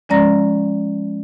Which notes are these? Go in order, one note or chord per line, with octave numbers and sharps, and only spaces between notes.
F3 G#3 C#4 D5 A#5 A#6